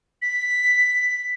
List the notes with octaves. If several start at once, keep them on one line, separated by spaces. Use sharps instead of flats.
B6